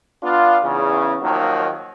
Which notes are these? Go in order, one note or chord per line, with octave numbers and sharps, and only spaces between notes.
B3 D4 F4
E2 C#3
D#2 D#3 F3 F#3 A#3